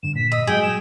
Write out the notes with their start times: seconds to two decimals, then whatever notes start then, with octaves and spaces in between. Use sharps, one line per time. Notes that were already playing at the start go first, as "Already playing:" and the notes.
0.03 G2 D3 E7
0.16 A#2 B6
0.32 D#5 E6
0.47 G2 F#3 G#3 G#4 G5
0.62 E7